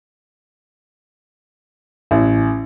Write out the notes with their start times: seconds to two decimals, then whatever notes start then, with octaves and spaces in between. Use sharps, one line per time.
2.11 A1